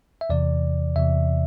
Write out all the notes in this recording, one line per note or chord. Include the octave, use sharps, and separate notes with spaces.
E5
E2 C3 E3 D5
E2 C3 E3 E5